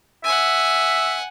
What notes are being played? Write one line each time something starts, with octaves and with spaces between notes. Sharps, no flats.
E5 F#5 G#5